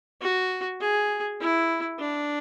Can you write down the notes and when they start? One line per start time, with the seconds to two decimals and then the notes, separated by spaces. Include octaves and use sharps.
0.21 F#4
0.80 G#4
1.40 E4
2.00 D4